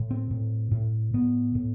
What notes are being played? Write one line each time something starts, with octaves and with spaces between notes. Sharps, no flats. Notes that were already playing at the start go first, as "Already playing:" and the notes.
Already playing: A2
C4
A2
A2
A2 B3
A2